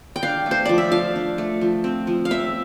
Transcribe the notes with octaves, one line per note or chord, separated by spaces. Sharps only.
G5
D4 F5
A3
C5
F3 D5
E5
F3 F5
D4
A3
F3
C4
F3
F5
C4 E5